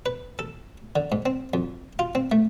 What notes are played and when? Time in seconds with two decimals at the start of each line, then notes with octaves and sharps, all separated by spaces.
0.06 B4
0.39 A4
0.96 D3
1.12 G#2
1.26 C4
1.54 F2
1.99 F4
2.15 C4
2.32 A3